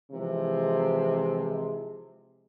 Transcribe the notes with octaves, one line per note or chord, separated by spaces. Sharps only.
C3 E3 F3 G#3